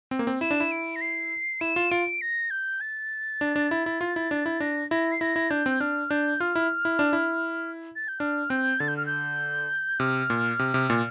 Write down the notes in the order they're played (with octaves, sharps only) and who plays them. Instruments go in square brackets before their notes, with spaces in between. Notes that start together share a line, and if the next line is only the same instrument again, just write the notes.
[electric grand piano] C4
A#3
C4
[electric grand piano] E4 [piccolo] E7
[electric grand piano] D4
E4
[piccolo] D7
A#6
C7
[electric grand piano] E4 [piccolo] E7
[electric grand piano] F4
[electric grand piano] F4 [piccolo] D7
[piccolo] A#6
G6
A6
[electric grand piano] D4
D4
E4
E4
F4
E4
D4
E4
[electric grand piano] D4 [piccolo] A#6
[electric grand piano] E4 [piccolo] A#6
[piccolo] C7
[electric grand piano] E4 [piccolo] A#6
[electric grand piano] E4
[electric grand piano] D4 [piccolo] G6
[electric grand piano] C4
[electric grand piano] D4 [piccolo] F6
[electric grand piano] D4 [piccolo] G6
[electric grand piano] F4 [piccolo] F6
[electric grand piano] E4
E4
D4
E4
[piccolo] A6
G6
[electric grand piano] D4 [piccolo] F6
[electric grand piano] C4 [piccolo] G6
[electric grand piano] D3 [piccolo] A6
[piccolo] G6
F6
G6
[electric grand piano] C3 [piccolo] F6
[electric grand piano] A#2
C3
C3
A#2